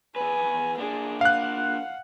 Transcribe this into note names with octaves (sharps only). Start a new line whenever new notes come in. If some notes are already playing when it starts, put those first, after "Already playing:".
E2 B4 G#5
A#3 D4 G#4
F5 F#5 F#6